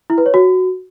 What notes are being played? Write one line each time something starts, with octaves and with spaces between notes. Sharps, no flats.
E4
B4
C#5
F#4